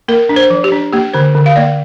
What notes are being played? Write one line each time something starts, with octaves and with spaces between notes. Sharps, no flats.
A#3 A#4
D4
C5
F3
G4
D4
A#3 G4
D3 C5
D3
F5
A#3 D5